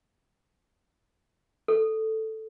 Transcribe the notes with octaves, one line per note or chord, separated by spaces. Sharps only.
A4